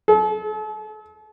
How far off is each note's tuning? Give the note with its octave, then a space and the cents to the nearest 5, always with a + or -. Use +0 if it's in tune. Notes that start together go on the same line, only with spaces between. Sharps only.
A4 -40